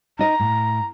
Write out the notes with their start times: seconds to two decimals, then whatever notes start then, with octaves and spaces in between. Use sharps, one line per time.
0.19 D#4 D#5 A#5
0.40 A2